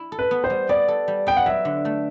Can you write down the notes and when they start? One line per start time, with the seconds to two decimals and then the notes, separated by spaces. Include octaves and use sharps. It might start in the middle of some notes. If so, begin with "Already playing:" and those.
Already playing: E4
0.12 A4
0.19 B4
0.31 B3
0.44 C5
0.50 G3
0.69 B3 D5
0.88 A4
1.08 G3
1.27 B3 G5
1.37 F#5
1.46 F#3 E5
1.65 D3
1.85 A3